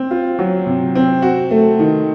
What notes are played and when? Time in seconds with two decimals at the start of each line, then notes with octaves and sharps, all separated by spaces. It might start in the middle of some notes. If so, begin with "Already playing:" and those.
Already playing: C4
0.11 F4
0.39 F#3
0.67 C3
0.95 C4
1.22 F#4
1.51 A3
1.79 D#3